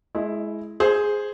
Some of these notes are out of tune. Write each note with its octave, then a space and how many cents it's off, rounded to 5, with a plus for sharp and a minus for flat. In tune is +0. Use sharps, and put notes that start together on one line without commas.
G#3 +25 E4 +0 D#5 -5
G#4 +0 C5 +0